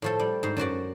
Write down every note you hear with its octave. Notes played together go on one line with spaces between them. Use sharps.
A2 F3 A4
G3
G#2 C5
F#2 F#3 F#4 D5